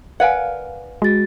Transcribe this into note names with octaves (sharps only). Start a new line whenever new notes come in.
A#4 B4 D5 F5 F#5 G#5
G#3 F#4 A6